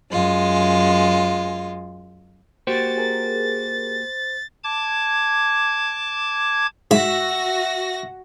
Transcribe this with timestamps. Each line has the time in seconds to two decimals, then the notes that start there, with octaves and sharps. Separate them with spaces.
0.11 F#2 G#3 F4
2.67 A#3 F#4 G4 C5 A6
2.98 G#4 A#4
4.64 A5 D6 G#6
6.91 G#2 F#4 E5 A#6